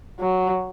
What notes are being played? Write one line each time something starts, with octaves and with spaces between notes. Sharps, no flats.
F#3